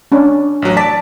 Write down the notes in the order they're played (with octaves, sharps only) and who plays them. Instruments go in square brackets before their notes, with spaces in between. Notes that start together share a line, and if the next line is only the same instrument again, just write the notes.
[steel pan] C#4 D4
[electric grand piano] A1 F#3
[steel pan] D5 [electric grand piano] A5 B6